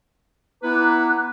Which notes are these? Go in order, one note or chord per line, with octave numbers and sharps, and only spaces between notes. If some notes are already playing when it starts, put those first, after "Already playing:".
B3 E4 B4 A#5 D6 F#6